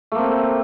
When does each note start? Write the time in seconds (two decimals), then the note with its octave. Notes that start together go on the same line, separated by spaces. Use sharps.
0.12 A3
0.15 A#3
0.19 C4